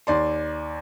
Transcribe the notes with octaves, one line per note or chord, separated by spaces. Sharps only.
D#2 D5 C6